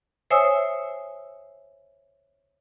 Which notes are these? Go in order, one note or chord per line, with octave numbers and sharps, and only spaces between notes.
C5 C#5 E5 G#5 D#6 E6